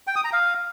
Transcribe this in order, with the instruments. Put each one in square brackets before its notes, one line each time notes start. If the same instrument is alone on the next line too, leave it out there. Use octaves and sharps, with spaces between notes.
[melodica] G5
D#6
A#5
F5